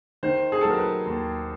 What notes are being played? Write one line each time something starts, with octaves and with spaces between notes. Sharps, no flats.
D#3 C5
G#4
F#3 A4
A#4
B4
D#2